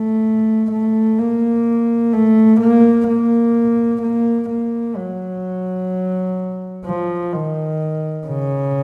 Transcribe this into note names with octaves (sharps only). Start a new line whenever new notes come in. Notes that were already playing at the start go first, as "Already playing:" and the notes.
Already playing: A3
A3
A#3
A3
A#3
A#3
A#3
A#3
F#3
F3
D#3
C#3